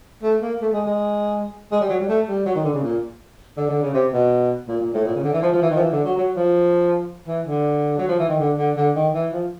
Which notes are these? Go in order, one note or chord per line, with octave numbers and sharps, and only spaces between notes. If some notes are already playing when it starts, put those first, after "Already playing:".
A3
A#3
A3
G#3
G#3
G#3
G3
F#3
G3
A3
G3
F#3
D#3
D3
C#3
A#2
D3
D3
C#3
C3
B2
A#2
A#2
A2
A#2
C#3
D3
E3
F3
F3
E3
D#3
F3
E3
D3
F#3
F#3
F3
E3
D3
F#3
F3
E3
D#3
D3
D3
D3
D#3
E3
F3